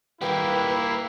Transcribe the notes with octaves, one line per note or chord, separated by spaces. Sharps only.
G3 A#3 E4 B4 G5